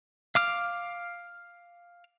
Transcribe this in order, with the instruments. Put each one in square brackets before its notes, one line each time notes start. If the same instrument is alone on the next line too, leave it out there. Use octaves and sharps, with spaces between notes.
[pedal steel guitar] F5 D6 F6